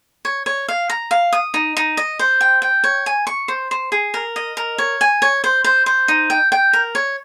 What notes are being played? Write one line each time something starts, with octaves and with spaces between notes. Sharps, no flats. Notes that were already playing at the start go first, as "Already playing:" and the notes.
C#5
C#5
F5
A#5
F5
D#6
D#4
D#4
D#5
C5
G5
G5
C#5
G#5
C#6
C5
C5
G#4
A#4
D#5
A#4
C#5
G#5
C#5
C5
C5
C5
D#4
G5
G5
A#4
C#5